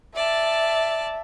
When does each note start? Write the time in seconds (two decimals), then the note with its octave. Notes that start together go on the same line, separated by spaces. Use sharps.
0.16 D5 E5 A5